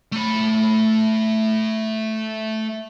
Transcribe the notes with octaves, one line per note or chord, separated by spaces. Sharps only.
A3 B5